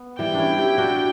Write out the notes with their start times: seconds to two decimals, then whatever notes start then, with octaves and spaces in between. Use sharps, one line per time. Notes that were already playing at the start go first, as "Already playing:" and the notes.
Already playing: B3
0.19 E3 G3 G5
0.34 C#4 D4 E4
0.58 E4 G4
0.78 D4 F#4